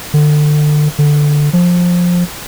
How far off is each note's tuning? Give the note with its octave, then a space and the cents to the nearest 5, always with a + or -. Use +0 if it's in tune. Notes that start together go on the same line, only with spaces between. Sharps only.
D3 +30
D3 +5
F3 +15